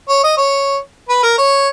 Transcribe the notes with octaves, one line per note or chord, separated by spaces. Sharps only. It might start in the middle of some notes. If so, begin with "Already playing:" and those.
C#5
D#5
C#5
B4
A#4
C#5